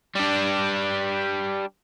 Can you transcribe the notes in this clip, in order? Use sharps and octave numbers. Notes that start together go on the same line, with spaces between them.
G3 D4